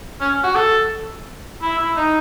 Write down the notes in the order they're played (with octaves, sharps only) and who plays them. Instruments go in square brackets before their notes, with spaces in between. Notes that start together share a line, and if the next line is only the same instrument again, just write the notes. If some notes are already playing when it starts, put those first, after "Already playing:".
[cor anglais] C#4
F#4
A4
E4
E4
D#4